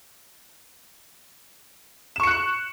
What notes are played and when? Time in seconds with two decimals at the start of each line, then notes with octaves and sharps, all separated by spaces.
2.16 E7
2.20 C#6
2.23 C#7
2.27 F#6